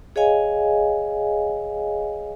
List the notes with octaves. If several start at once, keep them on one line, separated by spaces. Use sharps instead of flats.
G#4 C#5 D#5 F5 G#5